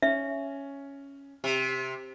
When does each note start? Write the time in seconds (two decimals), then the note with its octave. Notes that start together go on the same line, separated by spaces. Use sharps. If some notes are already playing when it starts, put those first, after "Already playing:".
0.02 C#4 E5
1.44 C3